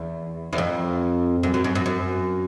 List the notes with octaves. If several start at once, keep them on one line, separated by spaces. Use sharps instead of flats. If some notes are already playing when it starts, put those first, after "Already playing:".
Already playing: E2
E2
F2
F#2
F#2
F#2
F#2
F#2